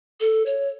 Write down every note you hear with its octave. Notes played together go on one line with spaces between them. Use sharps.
A4
C#5